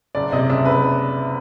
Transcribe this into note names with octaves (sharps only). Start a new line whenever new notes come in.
F#1 D5
C3 D#5
F#1 E5
F#1 B4